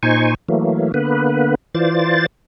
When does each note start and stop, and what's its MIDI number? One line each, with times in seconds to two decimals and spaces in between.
0.03 0.34 46
0.03 0.34 63
0.03 0.34 72
0.03 0.34 80
0.03 0.34 85
0.48 0.92 52
0.48 0.92 54
0.48 0.92 57
0.48 0.92 58
0.94 1.55 50
0.94 1.55 58
0.94 1.55 59
0.94 1.55 71
1.75 2.26 52
1.75 2.26 65
1.75 2.26 72
1.75 2.26 74
1.75 2.26 93